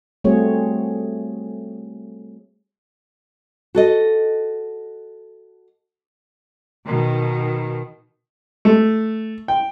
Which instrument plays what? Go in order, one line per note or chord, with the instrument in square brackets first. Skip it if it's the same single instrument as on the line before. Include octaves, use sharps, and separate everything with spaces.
[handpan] G3 A3 C4 F#4 G#4 C#5
[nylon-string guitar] F#4 A4 D#5
[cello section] B2 D#3
[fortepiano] A3
G5